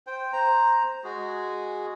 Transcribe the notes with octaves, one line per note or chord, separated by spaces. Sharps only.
C5 G5
C5 A#5
G#3 F#4 G#4